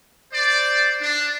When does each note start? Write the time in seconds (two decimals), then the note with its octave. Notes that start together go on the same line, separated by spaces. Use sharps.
0.32 C5 D5
1.00 D4